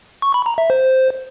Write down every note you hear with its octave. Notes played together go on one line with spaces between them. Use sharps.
C#6
B5
A#5
E5
C5